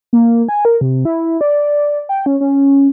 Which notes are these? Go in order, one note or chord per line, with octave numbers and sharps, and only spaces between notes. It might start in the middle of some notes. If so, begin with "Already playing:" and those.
A#3
G#5
A#4
C3
E4
D5
G5
C#4
C#4